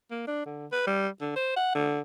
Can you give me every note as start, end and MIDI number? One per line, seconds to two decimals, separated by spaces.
0.11 0.25 58
0.27 0.45 62
0.45 0.67 50
0.72 0.83 71
0.87 1.08 55
1.21 1.31 50
1.36 1.52 72
1.56 1.74 78
1.75 2.00 50